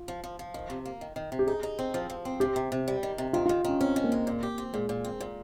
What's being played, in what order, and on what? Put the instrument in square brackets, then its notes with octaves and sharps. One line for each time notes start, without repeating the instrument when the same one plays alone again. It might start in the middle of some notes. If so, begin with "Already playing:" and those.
Already playing: [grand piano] F4
[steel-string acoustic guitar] F3
F3
F3
D#3
C3
A#3
D#3
D#3
C3
[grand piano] G4
[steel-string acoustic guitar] D#4 [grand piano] G#4
[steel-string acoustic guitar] D#4
C4
F3
F3
C4
[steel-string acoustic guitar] C3 [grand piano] G4
[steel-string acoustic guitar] C3
C3
G3
D#3
C3
[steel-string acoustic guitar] D#3 [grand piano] F4
[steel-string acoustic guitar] D#3 [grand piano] F4
[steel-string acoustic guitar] D#3 [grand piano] C#4
[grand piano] C4 [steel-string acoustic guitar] C#4
[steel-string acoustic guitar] D#3
[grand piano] A#3
[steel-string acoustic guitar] G#3
A#2
G4
C4
[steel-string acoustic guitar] A#2 [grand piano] G#3
[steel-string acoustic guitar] A#2
C4
A#2